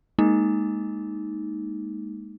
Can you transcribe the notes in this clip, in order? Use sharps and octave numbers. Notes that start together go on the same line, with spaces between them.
G#3 A#3 D#4